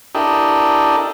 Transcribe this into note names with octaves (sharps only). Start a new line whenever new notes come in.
D4 E4 G4 A4 A#4 D#5